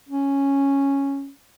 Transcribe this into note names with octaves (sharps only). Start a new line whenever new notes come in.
C#4